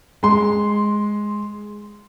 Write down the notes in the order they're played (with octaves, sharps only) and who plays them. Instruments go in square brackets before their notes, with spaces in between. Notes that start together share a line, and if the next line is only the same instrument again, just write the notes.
[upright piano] G#3 C6